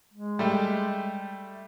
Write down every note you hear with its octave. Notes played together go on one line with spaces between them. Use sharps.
G#3
G3 A3 G4